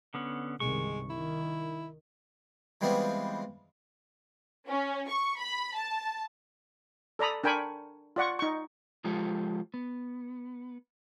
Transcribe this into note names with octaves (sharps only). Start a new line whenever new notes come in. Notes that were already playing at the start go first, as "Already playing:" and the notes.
D3 B3 C#4
G1 C2 D#3 G#3 C#6
D#3 E4
E3 G3 G#3 B3 C4 F4
C#4
C#6
B5
A5
A4 D5 A#5 B5 D#6
D4 A#4 G5 G#5 B5 C#6
F4 D5 F#5 C#6
D#4 C#6
F3 G#3 F4 G4 A4
B3